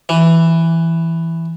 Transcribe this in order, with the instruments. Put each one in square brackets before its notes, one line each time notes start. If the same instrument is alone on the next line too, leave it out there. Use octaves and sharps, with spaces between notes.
[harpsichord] E3